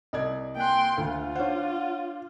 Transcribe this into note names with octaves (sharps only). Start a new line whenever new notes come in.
C2 D5 D#5 G#6
A#3 G5 G#5 C6 F#6
D2 F4
D4 C5 C#5 F#5